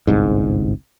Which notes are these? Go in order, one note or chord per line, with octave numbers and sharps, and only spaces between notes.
G1 C2 G#2